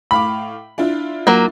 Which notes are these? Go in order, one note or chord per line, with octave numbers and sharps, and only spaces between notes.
A2 F5 B5 D6
D4 E4 F4
F#3 A#3